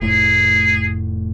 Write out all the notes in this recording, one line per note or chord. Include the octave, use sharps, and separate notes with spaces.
F1 A2 G#4